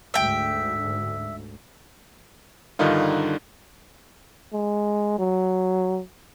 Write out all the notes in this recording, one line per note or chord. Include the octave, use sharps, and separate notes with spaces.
D2 G#2 E5 G5
G2 D3 D#3 D#4 F4
G#3
F#3